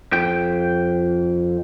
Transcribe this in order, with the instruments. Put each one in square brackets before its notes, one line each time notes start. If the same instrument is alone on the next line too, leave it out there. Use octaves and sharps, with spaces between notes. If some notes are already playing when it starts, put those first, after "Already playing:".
[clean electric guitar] F2 G5